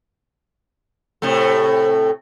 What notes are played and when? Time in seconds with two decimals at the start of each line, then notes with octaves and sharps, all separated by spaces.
1.22 A2 C3 A3